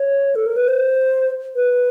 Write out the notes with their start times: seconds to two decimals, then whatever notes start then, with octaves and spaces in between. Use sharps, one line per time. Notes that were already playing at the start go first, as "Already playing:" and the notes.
Already playing: C#5
0.35 A4
0.46 A#4
0.56 B4
0.68 C5
1.56 B4